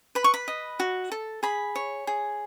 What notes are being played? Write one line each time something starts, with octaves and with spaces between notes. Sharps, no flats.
B4 B5
C#6
B5
D#5
F#4
A4
G#4 B5
C#5
G#4